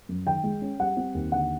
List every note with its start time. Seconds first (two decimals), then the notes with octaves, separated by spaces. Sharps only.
0.09 F#2
0.26 D#3 G5
0.44 G#3
0.62 C#4
0.79 G3 F#5
0.97 C4
1.14 D#2
1.32 D3 F#5